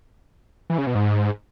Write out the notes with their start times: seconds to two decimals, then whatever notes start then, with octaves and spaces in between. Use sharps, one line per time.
0.70 E3
0.78 C#3
0.87 B2
0.95 G#2